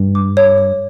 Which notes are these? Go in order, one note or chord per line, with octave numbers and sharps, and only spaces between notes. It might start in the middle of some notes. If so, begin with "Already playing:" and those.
Already playing: G2
D6
C#5
C#5